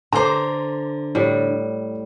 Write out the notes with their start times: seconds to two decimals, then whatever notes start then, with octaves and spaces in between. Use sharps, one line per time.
0.13 D3 C5 A#5 C6 D6
1.15 A2 G3